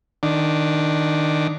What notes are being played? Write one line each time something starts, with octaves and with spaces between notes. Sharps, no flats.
D#3 D4